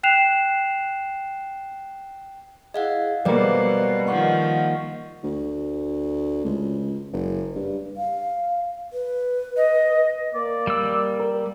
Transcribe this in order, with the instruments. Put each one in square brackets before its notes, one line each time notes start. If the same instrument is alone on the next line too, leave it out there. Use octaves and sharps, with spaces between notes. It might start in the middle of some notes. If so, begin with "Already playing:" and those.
[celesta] G5 F#6 C7 E7 F7
[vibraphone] E4 G#4 [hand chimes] D#5 F5 F#5
[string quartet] B2 [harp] G3 A#3 [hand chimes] B4 D5 D#5 [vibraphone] C5
[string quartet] D#3 F3 [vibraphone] F#5 C#6
[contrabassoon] D2
C#2
F#1
G2
[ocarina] F5
B4
[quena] D#5
[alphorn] A#3 [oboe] D5
[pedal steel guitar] G3 E6
[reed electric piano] A#4